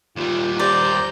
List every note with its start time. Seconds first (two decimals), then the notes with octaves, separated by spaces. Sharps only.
0.16 D#2 G3 F4
0.59 G4 C5 D5 A#5 G6